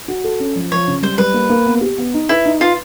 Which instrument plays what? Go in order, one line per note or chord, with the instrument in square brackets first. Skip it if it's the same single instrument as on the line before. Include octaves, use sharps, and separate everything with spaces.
[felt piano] F#4
A4
C#4
F3
[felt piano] F3 [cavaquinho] C#5
[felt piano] C#3
[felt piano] G3 [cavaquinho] C5
[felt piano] G3 [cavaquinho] B4
[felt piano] A#3
A#3
B3
G4
B3
D#4
[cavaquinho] E4 [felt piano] B4
[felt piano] D#4
[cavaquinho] F4 [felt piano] B4